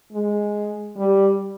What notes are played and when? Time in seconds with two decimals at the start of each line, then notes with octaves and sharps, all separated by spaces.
0.13 G#3
0.97 G3